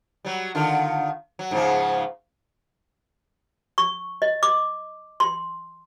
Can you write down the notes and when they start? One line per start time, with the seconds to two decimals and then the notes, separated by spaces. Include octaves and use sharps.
0.25 F#3 G3
0.55 D3 D#3 F4
1.39 F#3
1.51 G#2 C#3 F3
3.78 C#6
4.22 D#5
4.43 D6
5.20 C6